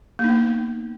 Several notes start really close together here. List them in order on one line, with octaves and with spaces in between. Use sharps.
A#3 D#4 B3